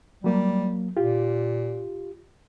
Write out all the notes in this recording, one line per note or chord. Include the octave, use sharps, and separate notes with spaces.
F#3 G3 A#3
A#2 F4 G4